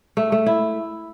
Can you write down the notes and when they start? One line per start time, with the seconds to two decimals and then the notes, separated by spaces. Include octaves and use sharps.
0.17 A3
0.32 A3
0.46 E4